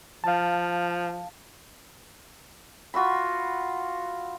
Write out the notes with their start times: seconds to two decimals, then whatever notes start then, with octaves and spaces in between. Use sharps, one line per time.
0.24 F3 F5 A5
2.94 F4 F#4 E5 B5